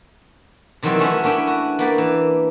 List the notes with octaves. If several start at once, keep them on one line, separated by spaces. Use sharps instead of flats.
C3 D#3 E3 F#3 G3 C4
F#3 A3 C#4 E4 F#4
B3 C#4 D4 E4 G5
F#4
A#3 B3 G4 D5
E3